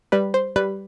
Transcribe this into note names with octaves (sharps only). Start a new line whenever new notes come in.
G3 B4
C5
G3 B4